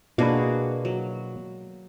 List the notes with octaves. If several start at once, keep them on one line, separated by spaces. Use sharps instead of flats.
B2 A#3 D4 F#4 G#4 B4
F#3